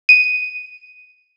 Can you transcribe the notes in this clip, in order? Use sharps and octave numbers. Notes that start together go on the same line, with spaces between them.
D#7